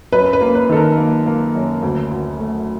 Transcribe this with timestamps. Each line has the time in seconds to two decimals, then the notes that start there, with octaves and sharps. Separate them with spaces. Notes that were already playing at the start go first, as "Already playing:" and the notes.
0.12 F#2 B4
0.33 B4
0.41 A#3
0.55 B4
0.69 D#3 A4
0.77 A#4
0.97 A#3
1.26 A#3
1.55 F#2
1.83 D2
2.11 D2
2.39 A3